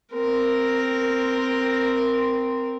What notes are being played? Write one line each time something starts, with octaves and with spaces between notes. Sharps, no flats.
C4 A#4